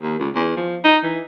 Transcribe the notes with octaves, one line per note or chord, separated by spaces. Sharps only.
D#2
C#2
E2
F3
D#4
E3